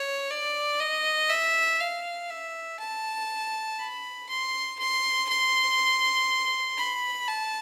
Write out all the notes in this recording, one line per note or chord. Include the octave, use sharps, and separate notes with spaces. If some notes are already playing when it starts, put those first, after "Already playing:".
Already playing: C#5
D5
D#5
E5
F5
E5
A5
B5
C6
C6
C6
B5
A5